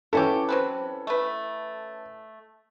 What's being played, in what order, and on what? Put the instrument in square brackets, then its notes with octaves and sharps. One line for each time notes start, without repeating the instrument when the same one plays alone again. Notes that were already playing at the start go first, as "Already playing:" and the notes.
[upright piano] E3 C#4 A4 [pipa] E4 F#4 G4
[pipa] F#3 C4 B4
A3 B4